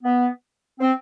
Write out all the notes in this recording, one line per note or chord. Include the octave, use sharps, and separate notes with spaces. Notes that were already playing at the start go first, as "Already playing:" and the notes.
B3
C4